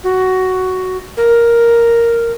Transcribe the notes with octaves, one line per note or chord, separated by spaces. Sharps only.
F#4
A#4